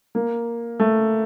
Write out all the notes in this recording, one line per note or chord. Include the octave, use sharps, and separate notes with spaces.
A#3
A3